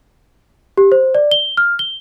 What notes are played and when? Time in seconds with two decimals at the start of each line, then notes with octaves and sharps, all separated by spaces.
0.77 G4
0.92 C5
1.15 D5
1.32 G7
1.57 F6
1.79 G7